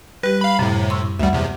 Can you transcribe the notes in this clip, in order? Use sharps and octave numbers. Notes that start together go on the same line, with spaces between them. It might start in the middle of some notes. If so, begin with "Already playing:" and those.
G3 G4 B4
F5 B5
F#2 A2 C3
C6 C#6 E6
D2 G3 E5 F#5
E2 C3